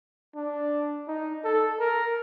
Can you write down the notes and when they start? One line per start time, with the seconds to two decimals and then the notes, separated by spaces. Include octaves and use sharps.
0.36 D4
1.08 D#4
1.44 A4
1.80 A#4